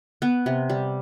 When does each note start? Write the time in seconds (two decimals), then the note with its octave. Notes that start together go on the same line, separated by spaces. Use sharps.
0.22 B3
0.46 C3
0.70 G3